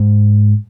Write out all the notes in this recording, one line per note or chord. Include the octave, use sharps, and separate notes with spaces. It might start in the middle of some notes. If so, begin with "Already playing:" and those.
Already playing: G#2